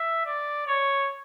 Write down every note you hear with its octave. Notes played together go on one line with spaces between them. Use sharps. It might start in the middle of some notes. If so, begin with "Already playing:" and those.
Already playing: E5
D5
C#5